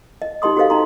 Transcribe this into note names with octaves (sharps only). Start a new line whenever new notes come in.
D#5
D#4 G4 D#5 C6 D#6
F#4 G4 A4 C5 D#5 F5
D#4 A#5 C6